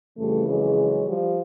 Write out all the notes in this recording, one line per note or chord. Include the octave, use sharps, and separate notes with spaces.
F2 C#3 E3 G3 A3
F#3 G#3
F3 G3